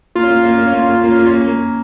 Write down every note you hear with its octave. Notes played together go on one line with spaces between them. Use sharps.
A#3 F4
C#4
A#3
C#4
A#3
C#4
A#3
C#4
A#3
C#4
A#3
C#4
A#3
C#4
A#3
C#4
A#3
C#4
A#3